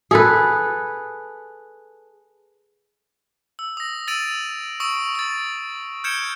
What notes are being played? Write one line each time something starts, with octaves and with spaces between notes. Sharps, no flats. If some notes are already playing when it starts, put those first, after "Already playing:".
G#4 A4 B4
E6
D#6 A#6
E6 A6 D7 D#7 F7
C#6 D#6 E6 D7
E6 A6
F6 G6 G#6 C#7 D7 E7